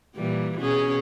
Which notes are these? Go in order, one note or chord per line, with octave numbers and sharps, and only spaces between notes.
A#2 E3 G3
B2 C#4 G#4